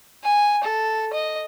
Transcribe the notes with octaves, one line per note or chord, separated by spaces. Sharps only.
G#5
A4
D#5